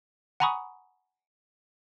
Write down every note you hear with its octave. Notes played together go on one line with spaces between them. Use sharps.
F#5 G#5 A#5 B5 C#6 D#6